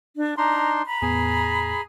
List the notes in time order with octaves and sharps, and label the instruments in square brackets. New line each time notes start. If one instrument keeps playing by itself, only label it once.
[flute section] D4
[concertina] D4 D#4 C6 [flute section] A#5
[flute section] A#5 B5
[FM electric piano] E2 A2 B3 [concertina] G#4 G#5